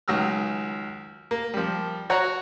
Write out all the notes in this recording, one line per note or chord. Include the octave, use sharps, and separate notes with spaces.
C#2 D#3 F#3 E6 F6
A#3
F3 G3
F#4 C#5 F#5 A#5